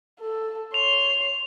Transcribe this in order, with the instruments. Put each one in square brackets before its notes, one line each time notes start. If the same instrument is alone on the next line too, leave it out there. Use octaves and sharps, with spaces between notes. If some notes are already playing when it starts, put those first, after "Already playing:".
[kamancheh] A4
[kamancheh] C#5 C6 [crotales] F7